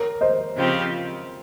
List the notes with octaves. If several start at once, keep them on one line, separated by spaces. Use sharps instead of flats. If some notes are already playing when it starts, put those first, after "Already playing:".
Already playing: A#4 C#5
C5 D#5
C#3 F3 C4 G4